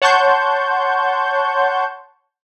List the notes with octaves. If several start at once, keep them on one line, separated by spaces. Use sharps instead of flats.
C#5 F#5 A5 C6 C#6 G6